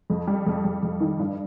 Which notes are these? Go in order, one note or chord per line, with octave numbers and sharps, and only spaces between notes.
F2
G3
F2
F2
F2
D#3
G2